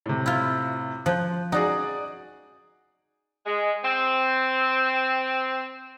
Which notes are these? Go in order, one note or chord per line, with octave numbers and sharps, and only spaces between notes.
A2 C3
E4 F4
F3 F#6 G6
D#4 F#4 G#4 D5 F#5
G#3
C4